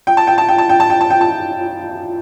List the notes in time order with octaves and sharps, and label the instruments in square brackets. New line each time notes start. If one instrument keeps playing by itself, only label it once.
[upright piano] G5
A5
G5
A5
G5
A5
G5
A5
G5
A5
G5
A5